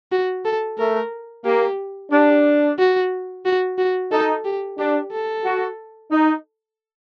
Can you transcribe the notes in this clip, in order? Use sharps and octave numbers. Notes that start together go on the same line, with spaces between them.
F#4
A4
A3 A#4
A#3 G4
D4 G4
F#4
F#4
F#4
D#4 A4
G4
D4 G4
A4
F#4
D#4